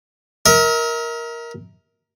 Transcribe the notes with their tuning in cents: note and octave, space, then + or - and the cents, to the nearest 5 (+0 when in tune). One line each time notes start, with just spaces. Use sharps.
A#4 +5 E5 -45